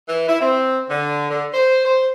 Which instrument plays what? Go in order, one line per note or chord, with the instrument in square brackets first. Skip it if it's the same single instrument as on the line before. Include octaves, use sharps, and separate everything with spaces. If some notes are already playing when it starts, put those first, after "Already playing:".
[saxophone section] E3
E4
C4
D3
D3
C5
C5